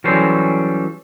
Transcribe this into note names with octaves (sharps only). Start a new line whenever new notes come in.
E3 F#3 G3 C#4 A4 C5